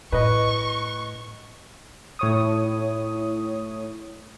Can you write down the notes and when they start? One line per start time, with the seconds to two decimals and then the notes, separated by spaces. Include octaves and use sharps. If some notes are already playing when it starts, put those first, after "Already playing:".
0.12 A2 B4 D#5 C#6
2.19 A2 C#5 D#6